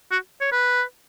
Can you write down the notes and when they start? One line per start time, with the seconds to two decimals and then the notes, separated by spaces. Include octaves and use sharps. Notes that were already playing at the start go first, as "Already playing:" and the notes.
0.11 F#4
0.41 C#5
0.52 B4